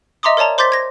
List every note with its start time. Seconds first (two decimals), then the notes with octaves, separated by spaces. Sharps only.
0.23 D#5 E5 A#5 C6 D6 D#6
0.37 A#4 C#5 D5 A5 A#5
0.58 C5 C6 D6 G6 A6 B6
0.72 G#6 A#6